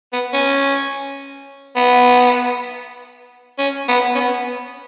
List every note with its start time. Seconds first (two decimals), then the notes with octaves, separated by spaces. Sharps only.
0.13 B3
0.33 C#4
1.76 B3
3.59 C#4
3.89 B3
4.15 C#4
4.20 B3